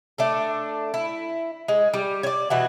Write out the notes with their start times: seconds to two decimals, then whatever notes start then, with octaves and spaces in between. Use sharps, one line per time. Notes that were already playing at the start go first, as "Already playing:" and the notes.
0.18 A3 D4 A4
0.94 E4
1.68 G#3
1.94 G3
2.23 C#5 D5
2.50 B2 E3 F#4